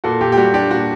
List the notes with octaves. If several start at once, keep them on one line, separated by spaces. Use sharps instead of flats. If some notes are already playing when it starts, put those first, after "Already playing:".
A#2 F#4 A4
A#2 G4
G4
G3 F#4
D4 G4
A#2 F#4